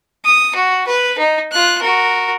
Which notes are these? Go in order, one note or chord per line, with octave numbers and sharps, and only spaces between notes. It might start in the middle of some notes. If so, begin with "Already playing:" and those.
D#6
F#4
B4
D#4
F4 F#6
F#4 A#4